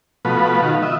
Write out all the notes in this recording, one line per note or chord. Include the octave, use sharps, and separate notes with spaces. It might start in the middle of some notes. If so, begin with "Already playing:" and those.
B2 F3 A3 F#4 B4
D#3 F4 F#4
D#5 E5